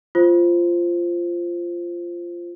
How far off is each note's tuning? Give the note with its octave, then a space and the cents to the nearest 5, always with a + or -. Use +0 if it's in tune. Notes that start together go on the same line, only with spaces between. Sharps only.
F4 -10 C5 +0